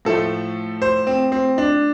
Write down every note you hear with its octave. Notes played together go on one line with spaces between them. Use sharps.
A2 F3 A3 A4
C5
C4
C4
D4